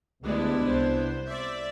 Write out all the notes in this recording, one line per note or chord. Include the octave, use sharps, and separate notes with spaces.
D2 G3 G#3 B3 D4 E4
C2 C5
D5 E5